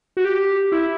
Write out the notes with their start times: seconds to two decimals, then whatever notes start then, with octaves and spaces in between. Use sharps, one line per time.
0.17 F#4
0.25 G4
0.72 E4